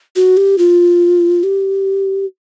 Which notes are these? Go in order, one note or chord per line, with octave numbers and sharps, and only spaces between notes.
F#4
G4
F4
G4